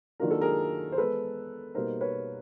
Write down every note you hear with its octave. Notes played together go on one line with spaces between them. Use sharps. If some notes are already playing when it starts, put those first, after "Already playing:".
D#3 F#3 A#3 D4 F4 A#4
A4
G#4 A#4
C5
E3 G#3 B3 A4 B4
B2 G3 A#3 D#4 A#4 C5
B4 C#5